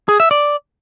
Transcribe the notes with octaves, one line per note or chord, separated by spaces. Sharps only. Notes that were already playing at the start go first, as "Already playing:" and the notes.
G#4
E5
D5